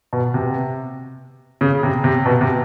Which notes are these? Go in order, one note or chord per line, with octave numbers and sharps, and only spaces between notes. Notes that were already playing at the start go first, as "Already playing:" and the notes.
B2
C3
C#3
C3
C3
B2
C3